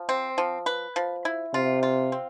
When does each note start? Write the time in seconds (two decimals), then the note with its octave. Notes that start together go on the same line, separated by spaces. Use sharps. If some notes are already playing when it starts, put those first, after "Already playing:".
Already playing: F3
0.09 C4
0.38 F3
0.66 B4
0.96 F3
1.25 E4
1.54 C3 F4
1.83 F4
2.12 C4